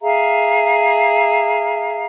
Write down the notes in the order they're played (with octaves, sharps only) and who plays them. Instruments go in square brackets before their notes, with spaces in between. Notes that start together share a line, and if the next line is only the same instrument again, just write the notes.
[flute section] G#4 E5 F5 A#5